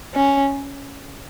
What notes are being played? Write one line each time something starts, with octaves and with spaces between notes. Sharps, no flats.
C#4